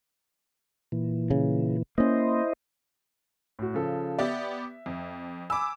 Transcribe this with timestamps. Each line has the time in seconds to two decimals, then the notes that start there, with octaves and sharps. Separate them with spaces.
0.92 A#2 E3
1.31 C#3
1.98 A#3 C#4 E4 C5 D#5
3.59 A2 F#4
3.74 C#3 F3 A4
4.19 B3 G4 D5 E5
4.86 F2
5.50 G#5 B5 D6 E6